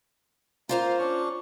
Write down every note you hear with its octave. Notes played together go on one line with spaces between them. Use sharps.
A#3 F4 C5 A#5
C#4 D4 C#6